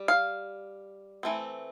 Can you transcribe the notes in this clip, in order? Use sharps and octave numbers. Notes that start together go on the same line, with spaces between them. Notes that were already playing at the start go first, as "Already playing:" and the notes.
Already playing: G3
F5
E3 A3 C4